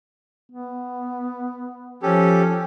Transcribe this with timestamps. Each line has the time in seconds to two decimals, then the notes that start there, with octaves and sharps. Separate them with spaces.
0.52 B3
2.03 F3 C#4 G4 A4